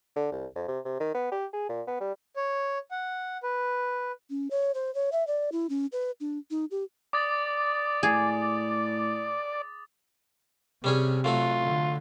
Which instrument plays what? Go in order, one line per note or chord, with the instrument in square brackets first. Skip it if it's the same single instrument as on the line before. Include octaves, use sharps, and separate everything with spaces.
[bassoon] D3
C2
F2
C3
C3
D#3
B3
G4
G#4
A#2
B3
G3
[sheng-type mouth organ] C#5
F#5
B4
[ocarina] C#4
C#5
C5
C#5
E5
D5
E4
C#4
B4
D4
D#4
G4
[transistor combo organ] D5 [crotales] D6 D#6 A6
[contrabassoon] A2 [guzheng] G#4
[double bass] C3 [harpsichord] G3 C#4 G#4
[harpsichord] F#3 A3 F#4 [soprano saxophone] F4
[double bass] D3